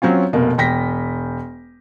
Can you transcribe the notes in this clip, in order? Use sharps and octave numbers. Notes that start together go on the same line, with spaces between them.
F#3 C4 C#4 F4
F1 B2 A#3
E1 G5 A#6 B6